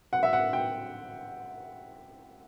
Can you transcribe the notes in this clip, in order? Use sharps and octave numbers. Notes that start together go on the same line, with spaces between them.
F#5
E5
F#5
G5